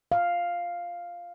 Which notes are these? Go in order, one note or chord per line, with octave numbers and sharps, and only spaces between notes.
F5